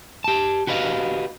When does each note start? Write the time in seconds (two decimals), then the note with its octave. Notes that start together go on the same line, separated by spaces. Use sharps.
0.24 G4 A5
0.67 F#4 G4 B4 D#5 F5